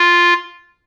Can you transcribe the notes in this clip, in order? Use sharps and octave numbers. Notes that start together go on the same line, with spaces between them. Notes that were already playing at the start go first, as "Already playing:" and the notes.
Already playing: F4